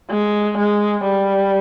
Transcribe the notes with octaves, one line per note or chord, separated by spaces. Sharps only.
G#3
G#3
G3